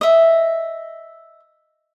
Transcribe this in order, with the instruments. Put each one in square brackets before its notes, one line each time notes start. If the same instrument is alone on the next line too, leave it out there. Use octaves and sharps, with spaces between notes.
[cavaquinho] D#5 E5